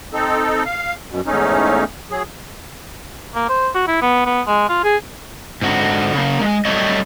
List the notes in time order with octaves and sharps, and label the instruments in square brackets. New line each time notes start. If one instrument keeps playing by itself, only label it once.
[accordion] C4 D#4 A4
F5
F#2 B2
E2 G#2 A3 C#4 D#4
F#3 G#4
[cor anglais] A#3
C5
F#4
E4
B3
B3
G#3
F4
G#4
[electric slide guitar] G#2 D3 F#4
C#3 A#3
G#3
F#3 G3 A3 C#5 D#5